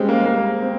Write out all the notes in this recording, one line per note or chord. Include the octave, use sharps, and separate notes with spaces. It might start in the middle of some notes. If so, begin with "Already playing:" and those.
Already playing: G3 G#3 C4 C#4
A#3
A#3
C4